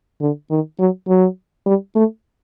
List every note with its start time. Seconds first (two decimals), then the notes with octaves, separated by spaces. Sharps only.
0.21 D3
0.51 D#3
0.79 F#3
1.08 F#3
1.66 G3
1.96 A3